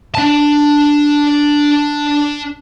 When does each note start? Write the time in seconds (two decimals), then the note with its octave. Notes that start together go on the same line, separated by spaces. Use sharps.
0.15 D4 A5